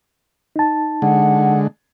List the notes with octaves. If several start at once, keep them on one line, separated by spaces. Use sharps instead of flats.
D#4 A5
D3 G#3 F#5